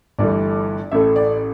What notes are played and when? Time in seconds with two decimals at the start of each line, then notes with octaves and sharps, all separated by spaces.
0.19 G1 G2 E3 A3 D5
0.92 A1 A2 A3 E5
1.16 D5